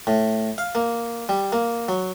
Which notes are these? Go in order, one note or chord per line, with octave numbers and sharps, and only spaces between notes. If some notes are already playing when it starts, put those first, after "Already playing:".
A2
F5
A#3
G3
A#3
F#3